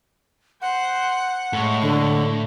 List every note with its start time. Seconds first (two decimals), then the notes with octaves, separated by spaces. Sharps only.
0.62 C5 F#5
1.53 A2 G#3 C#6
1.82 D3